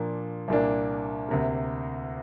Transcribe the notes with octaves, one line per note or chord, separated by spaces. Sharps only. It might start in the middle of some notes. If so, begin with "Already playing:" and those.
Already playing: A#2 F3 A#3 D4
C2 A#2 A#3 D4
D2 C3 A#3